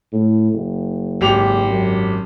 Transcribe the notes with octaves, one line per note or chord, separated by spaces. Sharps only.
A2
F#1
G#1 G4 F7
F#2